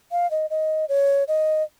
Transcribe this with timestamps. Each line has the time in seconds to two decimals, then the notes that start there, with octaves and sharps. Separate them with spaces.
0.12 F5
0.31 D#5
0.50 D#5
0.89 C#5
1.28 D#5